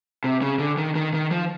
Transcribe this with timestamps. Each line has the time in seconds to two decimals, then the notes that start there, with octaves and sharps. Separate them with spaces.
0.24 C3
0.42 C#3
0.59 D3
0.77 D#3
0.95 D#3
1.14 D#3
1.31 F3